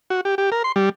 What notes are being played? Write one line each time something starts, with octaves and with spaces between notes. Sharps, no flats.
F#4
G4
G4
A#4
C6
G3